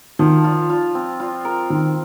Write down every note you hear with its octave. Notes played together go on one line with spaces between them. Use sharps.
D#3 F3
F4
F4
C4
F4
A#4
D#3 C4